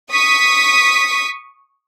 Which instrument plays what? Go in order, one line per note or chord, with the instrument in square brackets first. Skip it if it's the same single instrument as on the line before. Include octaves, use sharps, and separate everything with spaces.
[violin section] C#6 D#6 B6